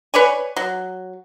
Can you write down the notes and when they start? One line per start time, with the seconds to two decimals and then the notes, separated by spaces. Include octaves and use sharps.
0.14 B4 C#5 D5 G#5
0.56 F#3